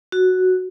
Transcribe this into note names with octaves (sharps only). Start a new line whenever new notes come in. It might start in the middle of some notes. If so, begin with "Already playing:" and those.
F#4